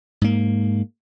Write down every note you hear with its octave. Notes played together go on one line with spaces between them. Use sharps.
G#2 A#3